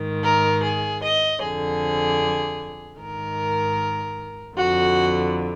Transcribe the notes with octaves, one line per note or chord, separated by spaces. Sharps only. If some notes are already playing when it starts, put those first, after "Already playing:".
Already playing: G#2 D#3
A#4
G#4
D#5
F2 D3 G#4
G#2 D#3 A#4
F2 D3 F#4